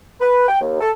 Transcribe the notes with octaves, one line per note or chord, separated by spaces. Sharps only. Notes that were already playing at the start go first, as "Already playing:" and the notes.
B4
G5
D#2
A4